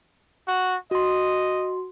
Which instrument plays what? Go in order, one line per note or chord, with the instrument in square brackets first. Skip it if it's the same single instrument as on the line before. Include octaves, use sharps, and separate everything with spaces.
[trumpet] F#4
[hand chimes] F#4 C6 [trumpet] D#5